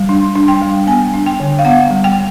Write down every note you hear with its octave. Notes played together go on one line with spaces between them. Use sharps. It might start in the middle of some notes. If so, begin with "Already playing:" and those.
Already playing: G3
D4
D4
G5
G3
B3 G#5
D4
G5
D3
F5
B3 F#5
G3
G5